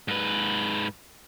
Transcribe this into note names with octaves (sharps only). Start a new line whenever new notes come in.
G#2 B4